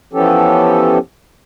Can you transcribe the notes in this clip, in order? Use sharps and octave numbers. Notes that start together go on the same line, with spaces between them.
E3 F3 B3 C#4 G4 A4